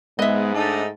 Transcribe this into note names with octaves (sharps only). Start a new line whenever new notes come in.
G#2 G#3 B3 D#5 E5
A3 D4 D#4 A5